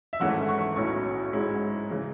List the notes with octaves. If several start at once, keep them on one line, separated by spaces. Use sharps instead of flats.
E5
G#1 G#2 E3 A3 C#4 F#5
C#6
B1 A2 F#3 C#4 E4 C#6
G#2 G#3 C#4 E4
C#3 E3